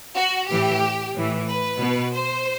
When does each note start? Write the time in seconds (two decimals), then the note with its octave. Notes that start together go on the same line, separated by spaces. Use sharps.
0.15 F#4
0.48 A2 E3 G4
1.14 A2 E3
1.47 B4
1.80 B2
2.13 C5